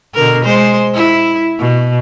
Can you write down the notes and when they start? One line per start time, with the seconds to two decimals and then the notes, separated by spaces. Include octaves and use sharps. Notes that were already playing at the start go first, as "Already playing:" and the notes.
0.14 B2 D3 A#4
0.45 G#3 C5
0.94 E4
1.59 B2